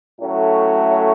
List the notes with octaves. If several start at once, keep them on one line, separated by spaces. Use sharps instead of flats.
A2 F#3 A3 C#4